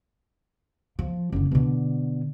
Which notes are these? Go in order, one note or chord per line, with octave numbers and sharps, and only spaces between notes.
F3
F#1 D3
B2 D3